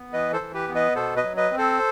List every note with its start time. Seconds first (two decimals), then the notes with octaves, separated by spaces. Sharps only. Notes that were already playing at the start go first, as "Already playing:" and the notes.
Already playing: B3
0.13 E3 B4 D#5
0.33 A4 C5
0.41 E3
0.54 G4 B4
0.68 B3
0.75 B4 D#5
0.95 B2 A4 C5
1.16 B4 D#5
1.24 F#3
1.37 B4 D#5
1.51 C4
1.58 A4 C5